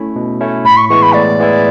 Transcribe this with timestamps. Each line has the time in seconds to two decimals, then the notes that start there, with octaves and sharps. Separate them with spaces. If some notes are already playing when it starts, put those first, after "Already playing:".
Already playing: A3 C#4 E4
0.16 B2
0.41 A3 C#4 E4
0.64 A2 B5
0.77 C#6
0.89 E3 G#3 B3 E4 C#6
1.02 B5
1.14 A2 D5
1.39 E3 G#3 B3 E4